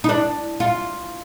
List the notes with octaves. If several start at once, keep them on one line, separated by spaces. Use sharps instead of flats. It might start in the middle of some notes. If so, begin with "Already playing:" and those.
D#4
D4
F4